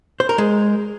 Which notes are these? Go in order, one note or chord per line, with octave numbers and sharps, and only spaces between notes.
C5
A#4
G#3